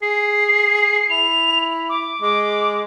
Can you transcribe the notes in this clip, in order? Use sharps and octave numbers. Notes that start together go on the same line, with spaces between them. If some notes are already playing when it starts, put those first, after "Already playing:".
G#4 C7
E4 F7
D6
G#3 D6